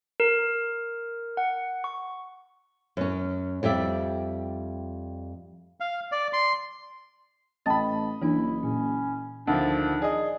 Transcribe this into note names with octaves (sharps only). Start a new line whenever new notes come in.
A#4
F#5
C#6
F#2 C#4
F2 G3 D5 E5
F5
D5
C6
A1 D#5 G5 A5 B5 A6
F#1 E3 A#3 D4 E4
A#2 C#4
D2 D#3 F3 D4
G#4 D5 D#5